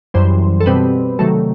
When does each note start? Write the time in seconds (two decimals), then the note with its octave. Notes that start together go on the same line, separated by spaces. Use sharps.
0.14 F#2 E3 G3 C5
0.60 A4
0.66 B2 G3 C4 B4
1.19 C3 D#3 F#3 A3 A4